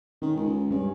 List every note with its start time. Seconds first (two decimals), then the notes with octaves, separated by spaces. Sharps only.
0.22 D#3 C#4
0.36 C#2
0.71 G2 C#4